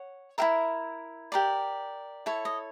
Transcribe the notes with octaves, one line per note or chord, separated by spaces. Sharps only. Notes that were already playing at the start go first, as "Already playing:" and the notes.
Already playing: C#5 F#5
E4 G4 A#4 E5
G4 A#4 D5
E4 A4 C#5
D#5